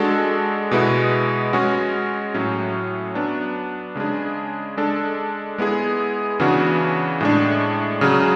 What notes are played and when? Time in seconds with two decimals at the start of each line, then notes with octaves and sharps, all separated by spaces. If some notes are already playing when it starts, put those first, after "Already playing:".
Already playing: G#3 D4 F#4 A4
0.71 B2 G#3 B3 E4
1.53 G#3 C#4 F#4
2.34 A2 F#3 C#4
3.15 F#3 B3 D4
3.95 C#3 G#3 D4 G#4
4.77 G#3 D4 A4
5.58 G#3 B3 E4 G#4
6.39 C#3 E3 B3 D4 F#4
7.21 A2 G#3 D4
8.01 C#3 F#3 C#4 G#4